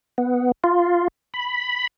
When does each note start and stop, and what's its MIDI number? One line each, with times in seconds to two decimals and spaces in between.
0.18 0.52 59
0.64 1.08 65
1.34 1.87 83